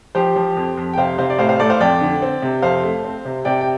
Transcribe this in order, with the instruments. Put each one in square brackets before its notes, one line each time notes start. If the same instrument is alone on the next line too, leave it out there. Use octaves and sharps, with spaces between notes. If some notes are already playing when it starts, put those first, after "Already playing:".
[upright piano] F3 G4 C5
F3
F2
F2
G5
C3 C5 F5
C3 C5 F5
D5
A2 C5 F5
C5 F5
A2 A4 D5
C5 F5
F2 D5 G5
D3
C4
C3
F2 C5 F5
A3
C4
C3
C3 D5 G5
G5